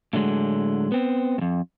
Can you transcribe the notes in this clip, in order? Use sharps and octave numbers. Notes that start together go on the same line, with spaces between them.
A2 D3 F#3 G#3
B3 C4
F2 G#2